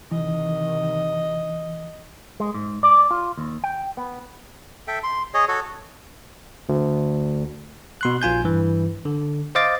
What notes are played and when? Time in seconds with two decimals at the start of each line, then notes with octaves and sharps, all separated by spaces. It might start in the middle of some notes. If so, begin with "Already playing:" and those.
0.11 C3 D#3 E3 D#5
2.40 G#3
2.54 G#2
2.83 D5
3.11 F4
3.38 D#2
3.64 G5
3.97 B3
4.88 A4 E5 G5
5.04 C6
5.34 G#4 C#5 D#5
5.48 F#4 A4 C#5
6.69 D2
8.01 B2 C6 F#6
8.22 A#1 F4 G#5 G6
8.44 G2 E3
9.05 D3
9.55 C5 D#5 F5 D6 A6